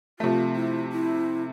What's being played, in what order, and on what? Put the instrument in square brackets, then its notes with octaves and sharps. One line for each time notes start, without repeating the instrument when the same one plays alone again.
[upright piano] C3 F3 A3 [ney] F4
[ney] E4
E4